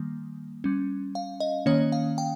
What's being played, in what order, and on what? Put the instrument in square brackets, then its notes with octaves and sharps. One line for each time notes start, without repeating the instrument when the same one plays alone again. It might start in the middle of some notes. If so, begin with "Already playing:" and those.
Already playing: [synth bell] D#3 G3 A#3
G3 C#4
F5
D#5
D#3 A#3 C#4 C#5
F5
G5